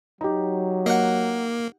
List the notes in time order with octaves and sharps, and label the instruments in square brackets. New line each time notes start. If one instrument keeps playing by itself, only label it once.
[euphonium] F#3 [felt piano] D#4 G4
[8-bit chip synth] A#3 [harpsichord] D#5 F#5